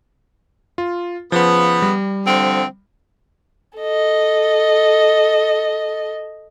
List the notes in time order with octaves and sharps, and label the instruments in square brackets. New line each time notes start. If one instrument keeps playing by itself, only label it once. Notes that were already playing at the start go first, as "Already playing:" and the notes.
[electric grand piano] F4
[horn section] C#3 B3 [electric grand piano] F3
[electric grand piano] G3
[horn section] D3 F3 C4
[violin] A4 D#5